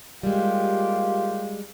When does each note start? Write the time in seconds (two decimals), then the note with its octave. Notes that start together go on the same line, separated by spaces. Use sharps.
0.23 G3 G#3 A#3 F4 G4